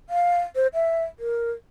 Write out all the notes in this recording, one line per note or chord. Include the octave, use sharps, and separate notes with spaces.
F5
C5
E5
A#4